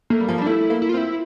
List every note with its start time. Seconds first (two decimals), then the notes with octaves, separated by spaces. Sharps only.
0.10 A3 A#3
0.20 G3
0.28 F3
0.38 G3 D4
0.46 A3 E4
0.70 A#3
0.82 E4
0.89 F4
0.94 C4 E4